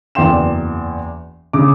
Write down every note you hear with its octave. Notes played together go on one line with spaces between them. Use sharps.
F#1 E2 D5 G5 C6 E7
C#3 D6